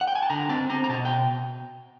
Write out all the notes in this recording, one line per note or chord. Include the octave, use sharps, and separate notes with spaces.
F#5
G5
G#5
A5
D3 A#5
C4 A5
C4 A#5
A#5
B2 A5
G5